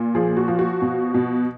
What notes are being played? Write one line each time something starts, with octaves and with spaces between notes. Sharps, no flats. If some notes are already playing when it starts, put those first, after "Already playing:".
Already playing: A#2
F3 G#4
F#4
F3
F#4
B2
B2